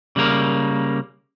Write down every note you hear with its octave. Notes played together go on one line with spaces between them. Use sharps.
C#3 G3 A#3 A#4